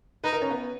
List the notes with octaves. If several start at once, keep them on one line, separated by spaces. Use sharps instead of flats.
D#4 B4
A#4
C#4
B3